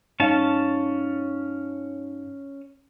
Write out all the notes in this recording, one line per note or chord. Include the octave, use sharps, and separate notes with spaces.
G2 C#4 D#4 F5 A5